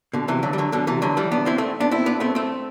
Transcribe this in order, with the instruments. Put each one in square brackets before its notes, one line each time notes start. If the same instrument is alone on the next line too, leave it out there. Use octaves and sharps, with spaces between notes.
[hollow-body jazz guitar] B2 D3
C3 E3
D3 F#3
G3
D3 F#3
B2 D3
C3 E3
D3 F#3
E3 G3
B3 D4
C4 E4
A3 C4
B3 D4
C4 E4
B3 D4
A3 C4
A3 C4